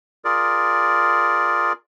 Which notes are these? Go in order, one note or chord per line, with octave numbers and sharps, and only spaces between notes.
F4 G#4 A#4 D5